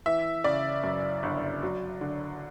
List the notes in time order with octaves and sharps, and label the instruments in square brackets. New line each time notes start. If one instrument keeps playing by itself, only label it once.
[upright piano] E3 E5
C#3 D5
F#2
G1
F#3
D3